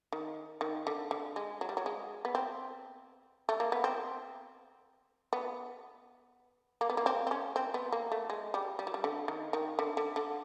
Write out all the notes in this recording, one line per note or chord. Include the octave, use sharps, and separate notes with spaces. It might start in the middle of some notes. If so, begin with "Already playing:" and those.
D#3
D#3
D3
D3
G#3
F#3
G3
F#3
G#3
B3
C4
A3
A#3
B3
C4
B3
A#3
B3
A#3
C4
C4
C#4
C4
B3
A#3
A3
G#3
G3
G3
F#3
G3
D3
D#3
D#3
D3
D3
D3